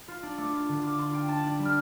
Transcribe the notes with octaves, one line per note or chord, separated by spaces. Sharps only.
F4
D4
A3 D6
F4
D3
F4 D6
D4 C6
F4 G5
D4 A5
D4
G3
F6